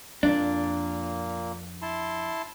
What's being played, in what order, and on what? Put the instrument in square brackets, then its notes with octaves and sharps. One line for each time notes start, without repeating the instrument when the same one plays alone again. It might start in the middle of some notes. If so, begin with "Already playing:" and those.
[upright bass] F2 [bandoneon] A#2 A#3 [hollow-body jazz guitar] D4
[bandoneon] E4 A5 C6